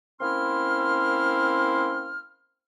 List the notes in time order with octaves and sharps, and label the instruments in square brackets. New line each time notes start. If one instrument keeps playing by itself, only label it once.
[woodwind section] A#3 C4 C#4 E4 C6 F6